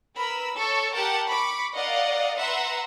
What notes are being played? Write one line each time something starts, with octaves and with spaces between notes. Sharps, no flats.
A#4 B4 B5 E6
A4 C#5 C#6
G4 A#4 F#5 G5 A5
B5 C#6 D6
A#4 D5 D#5 F5 F#5
B4 E5 F#5 A#5 C6